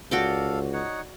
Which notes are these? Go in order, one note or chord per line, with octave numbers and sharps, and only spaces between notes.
C#2 F#4 A4 D5 F5 G5
D#4 C#5 F#5